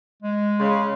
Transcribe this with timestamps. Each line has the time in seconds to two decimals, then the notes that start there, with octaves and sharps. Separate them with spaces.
0.23 G#3
0.60 C#3 C6